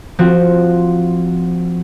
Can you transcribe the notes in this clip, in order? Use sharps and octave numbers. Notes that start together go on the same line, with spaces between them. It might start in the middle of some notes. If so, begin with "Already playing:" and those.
F3 C4 F#4